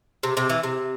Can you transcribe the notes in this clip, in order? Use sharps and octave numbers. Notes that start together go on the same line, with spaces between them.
C3
C3
E3
C3